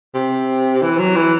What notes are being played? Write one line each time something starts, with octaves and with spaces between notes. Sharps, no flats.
C3
E3
F#3
E3